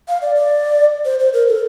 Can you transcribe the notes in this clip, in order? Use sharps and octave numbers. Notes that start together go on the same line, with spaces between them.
F5
D5
D5
C5
C5
A#4
A4